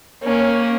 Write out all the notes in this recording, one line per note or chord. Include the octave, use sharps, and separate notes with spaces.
A#3 C#4